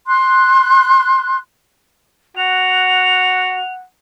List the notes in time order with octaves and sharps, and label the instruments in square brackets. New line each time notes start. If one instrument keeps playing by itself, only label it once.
[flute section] C6 F#6
[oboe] F#4 [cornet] F#5 [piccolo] F7